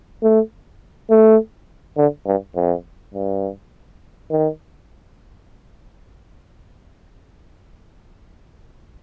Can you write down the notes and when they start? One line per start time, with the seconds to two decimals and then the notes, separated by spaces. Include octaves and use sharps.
0.22 A3
1.10 A3
1.97 D3
2.26 G2
2.56 F2
3.14 G2
4.30 D#3